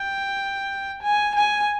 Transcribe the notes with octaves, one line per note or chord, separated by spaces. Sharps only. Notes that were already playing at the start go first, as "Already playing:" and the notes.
Already playing: G5
G#5
G#5